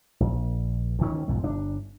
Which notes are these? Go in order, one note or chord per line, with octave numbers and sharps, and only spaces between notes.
A#1
D2 D#3 C#4
B1 F2 G#2
G1 D4